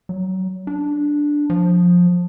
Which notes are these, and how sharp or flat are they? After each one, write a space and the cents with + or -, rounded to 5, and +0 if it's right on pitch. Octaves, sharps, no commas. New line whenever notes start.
F#3 +25
D4 +0
F3 +20